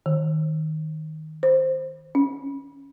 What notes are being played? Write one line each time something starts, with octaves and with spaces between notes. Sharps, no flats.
D#3
C5
C#4